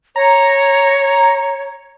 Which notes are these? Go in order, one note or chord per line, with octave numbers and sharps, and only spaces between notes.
C#5 A#5